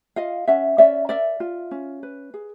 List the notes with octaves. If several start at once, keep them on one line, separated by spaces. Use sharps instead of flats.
F4 D#5 F5
C#4 E5 F#5
C#4 D5 E5
A#4 D5 E5
F4
C#4
B4
G#4